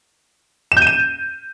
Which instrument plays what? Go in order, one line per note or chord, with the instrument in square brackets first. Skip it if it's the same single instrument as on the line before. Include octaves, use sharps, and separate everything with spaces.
[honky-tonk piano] E7
G6
D#7
E7